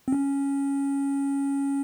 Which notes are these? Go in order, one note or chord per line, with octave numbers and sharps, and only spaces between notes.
C4
C#4